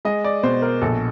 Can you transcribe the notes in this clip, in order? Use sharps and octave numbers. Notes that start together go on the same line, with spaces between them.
G#3 D#5
D5
B2 C5
A#4
A#1 A4